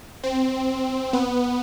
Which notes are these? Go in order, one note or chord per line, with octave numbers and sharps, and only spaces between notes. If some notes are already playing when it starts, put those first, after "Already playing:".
C4
B3